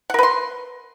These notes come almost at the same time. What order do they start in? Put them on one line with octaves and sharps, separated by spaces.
F#5 A#4 B4 C6